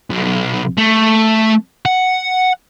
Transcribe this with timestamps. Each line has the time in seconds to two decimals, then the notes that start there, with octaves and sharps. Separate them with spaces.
0.10 B1
0.78 A3
1.85 F#5